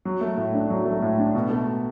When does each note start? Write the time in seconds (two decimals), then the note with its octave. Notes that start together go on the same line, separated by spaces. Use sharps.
0.05 F#3
0.21 A3
0.37 A2
0.54 D4
0.70 F#3
0.86 A3
1.02 A2
1.19 D4
1.35 B2
1.51 A3